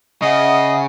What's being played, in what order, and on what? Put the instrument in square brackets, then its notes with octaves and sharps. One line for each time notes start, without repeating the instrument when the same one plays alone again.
[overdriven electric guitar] C#3 [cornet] D#5 [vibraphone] E5 F#5 D#6